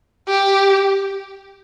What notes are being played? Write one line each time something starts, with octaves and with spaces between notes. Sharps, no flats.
G4